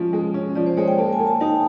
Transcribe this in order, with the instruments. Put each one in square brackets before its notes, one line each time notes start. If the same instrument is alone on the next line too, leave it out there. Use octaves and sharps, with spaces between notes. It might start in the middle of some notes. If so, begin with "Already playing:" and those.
Already playing: [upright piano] F3 G#3 C#4
G#3
C#4
[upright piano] F3 [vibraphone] D5
[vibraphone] C5
[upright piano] G#3 [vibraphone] C#5
[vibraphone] G5
[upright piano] A#3 [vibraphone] A5
[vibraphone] G#5
[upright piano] A#3
[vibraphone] A5
[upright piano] D#4 [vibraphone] G#5
[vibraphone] G5